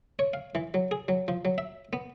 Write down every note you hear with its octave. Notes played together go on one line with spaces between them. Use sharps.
C#5
F5
E3
F#3
G#4
F#3
F3
F#3
E5
B3